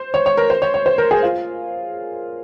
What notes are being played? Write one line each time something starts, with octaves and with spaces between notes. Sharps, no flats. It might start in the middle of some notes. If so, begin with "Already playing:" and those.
Already playing: C5
C#5
C#5
A#4
C5
C#5
C#5
C5
A#4
G#4
F4